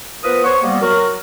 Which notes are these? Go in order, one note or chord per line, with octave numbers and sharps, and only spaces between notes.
F3 B3 A#4 B4 D#6
C5 C#5 F#5 C#6
G3 A#3 B3
F#3 F#4 A#4